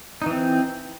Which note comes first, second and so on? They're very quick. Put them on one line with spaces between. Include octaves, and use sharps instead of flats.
D#4 E3 C4